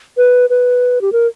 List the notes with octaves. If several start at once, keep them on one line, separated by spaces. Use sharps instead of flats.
B4
B4
G4
A#4